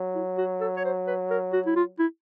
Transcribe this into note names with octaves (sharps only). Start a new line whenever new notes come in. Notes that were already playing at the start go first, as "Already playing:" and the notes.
Already playing: F#3
E4
F#4
A4
C#5
C5
B4
A#4
F#4
E4
F4
E4